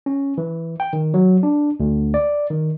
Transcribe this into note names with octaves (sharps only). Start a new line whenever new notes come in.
C#4
E3
G5
D#3
F#3
D4
D2
D5
D#3